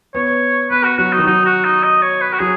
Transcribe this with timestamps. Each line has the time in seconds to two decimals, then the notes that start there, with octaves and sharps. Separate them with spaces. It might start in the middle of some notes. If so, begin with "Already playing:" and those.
0.15 B3 C#5
0.71 B3 B4
0.84 F#4
0.98 F#3 F#4
1.13 D#4
1.18 D#3
1.27 F#3 D#4
1.46 F#4
1.65 D#4
1.84 D#5
2.03 C#5
2.22 B4
2.33 F#4
2.39 F#3 G#4